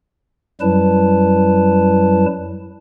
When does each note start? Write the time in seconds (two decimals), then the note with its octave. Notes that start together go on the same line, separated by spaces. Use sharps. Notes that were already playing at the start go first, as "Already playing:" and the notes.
0.61 F#2 F#3 G3 E4 B4 A5